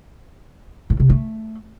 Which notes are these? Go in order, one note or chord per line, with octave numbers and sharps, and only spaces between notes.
A2
C3
A3